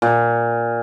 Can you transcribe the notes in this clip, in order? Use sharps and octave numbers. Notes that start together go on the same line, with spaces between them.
A#2